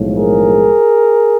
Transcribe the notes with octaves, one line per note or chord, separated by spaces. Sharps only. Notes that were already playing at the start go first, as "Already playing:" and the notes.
Already playing: B1 A2 F3 G#3
G#4 A#4